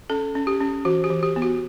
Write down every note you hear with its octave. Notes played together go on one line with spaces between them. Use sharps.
C#4 A4
C#4
G4
C#4
E3 F#4
G4
E3
G4
B3
F#4